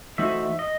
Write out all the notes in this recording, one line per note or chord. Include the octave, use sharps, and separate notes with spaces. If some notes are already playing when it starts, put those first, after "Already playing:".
E3 A3 D#4 F#4 C5 E5
D#5